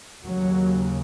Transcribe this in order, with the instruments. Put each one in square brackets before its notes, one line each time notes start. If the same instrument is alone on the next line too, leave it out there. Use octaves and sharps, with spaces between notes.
[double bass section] D#2 C#3 F#3